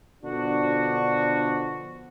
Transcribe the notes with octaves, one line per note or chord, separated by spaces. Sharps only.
B2 D3 F3 D4 F#4